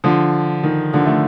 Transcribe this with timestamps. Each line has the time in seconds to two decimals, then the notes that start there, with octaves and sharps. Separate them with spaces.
0.04 D3 F3
0.63 D#3
0.93 D3 F3
1.06 A3